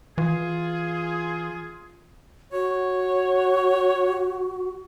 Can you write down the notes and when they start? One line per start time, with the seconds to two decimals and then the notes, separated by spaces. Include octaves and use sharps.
0.18 E3 F4 G#4
2.52 F#4 C#5